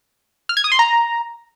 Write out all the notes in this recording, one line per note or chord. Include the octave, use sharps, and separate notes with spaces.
F6
G#6
D#6
C6
A#5